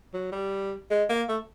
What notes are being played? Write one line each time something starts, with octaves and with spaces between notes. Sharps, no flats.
F#3
G3
G#3
A#3
A3